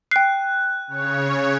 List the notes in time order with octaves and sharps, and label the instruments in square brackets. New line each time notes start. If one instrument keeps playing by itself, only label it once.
[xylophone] G5 C7 [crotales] F#6
[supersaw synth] C#3 C#5